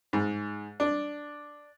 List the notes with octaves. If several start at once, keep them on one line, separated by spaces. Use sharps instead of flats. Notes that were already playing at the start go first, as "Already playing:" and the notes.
G#2
D4